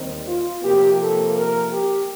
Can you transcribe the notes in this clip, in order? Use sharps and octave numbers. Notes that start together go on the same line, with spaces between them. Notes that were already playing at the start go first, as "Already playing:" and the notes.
Already playing: D#2 D#3 G3 C4
F4
C3 F3 A#3 G4
A4
A#4
G4